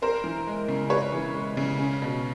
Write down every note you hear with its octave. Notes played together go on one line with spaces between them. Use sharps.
C4 A#4 C5
E3
G#3
C#3
C4 B4 C#5
E3
G#3
C#3
C#4
B2